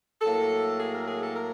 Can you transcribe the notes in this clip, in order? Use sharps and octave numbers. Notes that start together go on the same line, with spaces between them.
A2 F#3 A#3 A4
G#4
A#4
G#4
A4
A#4